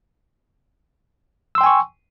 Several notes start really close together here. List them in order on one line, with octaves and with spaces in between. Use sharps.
E6 C6 G5 G#5 C#6